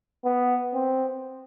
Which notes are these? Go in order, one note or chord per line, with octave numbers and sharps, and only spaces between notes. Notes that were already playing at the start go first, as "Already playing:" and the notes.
B3
C4